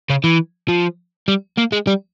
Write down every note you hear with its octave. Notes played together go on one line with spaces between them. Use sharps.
C#3
E3
F3
G3
A#3
G#3
G3